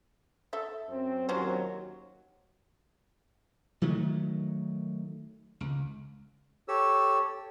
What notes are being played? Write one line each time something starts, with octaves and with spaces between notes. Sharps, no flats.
A4 E5
F#2 C4
D#2 F#3 C#4 F4 C5
D#3 F#3 A3
C#2
G4 A4 C#5 E6